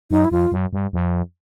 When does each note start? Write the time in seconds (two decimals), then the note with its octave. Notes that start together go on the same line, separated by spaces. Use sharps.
0.11 F#2 D#4
0.24 E4
0.31 F2 F4
0.52 F#2
0.73 G2
0.93 F2